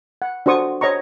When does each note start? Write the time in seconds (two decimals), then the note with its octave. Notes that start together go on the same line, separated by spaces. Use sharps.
0.22 F#5
0.46 D4 F#4 C5 C#6 D#6
0.81 C5 C#5 D#5 A#5 C#6